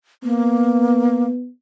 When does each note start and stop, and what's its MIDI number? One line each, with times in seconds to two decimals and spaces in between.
0.23 1.27 58
0.23 1.49 59